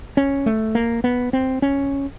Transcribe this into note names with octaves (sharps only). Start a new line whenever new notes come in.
C#4
A3
A#3
B3
C4
C#4